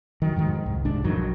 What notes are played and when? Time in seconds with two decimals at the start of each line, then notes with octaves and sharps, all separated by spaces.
0.22 D#3 F#3
0.36 F2 G#2 D#3
0.66 C2
0.85 C2 G#2 D4
1.04 B1 F2 D#3 F#3